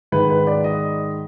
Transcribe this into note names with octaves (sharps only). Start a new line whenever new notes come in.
G#2 D#3 B4
B4
D5
D#5